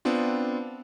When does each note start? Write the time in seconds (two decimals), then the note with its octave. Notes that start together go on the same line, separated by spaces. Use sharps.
0.05 B3 C4 D4 F4